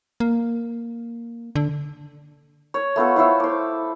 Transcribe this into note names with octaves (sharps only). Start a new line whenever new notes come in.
A#3
D3
C#5
A3 B3 F4 A4
E4 C5 C#5 E5
C5 D6